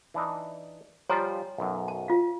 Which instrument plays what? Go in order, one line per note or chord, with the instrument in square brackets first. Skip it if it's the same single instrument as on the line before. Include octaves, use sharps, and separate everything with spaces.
[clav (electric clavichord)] E3 D4 D#4
[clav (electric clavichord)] F3 G3 F4 [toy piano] C#5 G#5 A#5
[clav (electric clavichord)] B1 F#2
[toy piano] A5
F4 F5